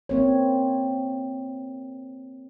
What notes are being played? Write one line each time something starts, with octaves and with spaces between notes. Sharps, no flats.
A#3 C4 C#5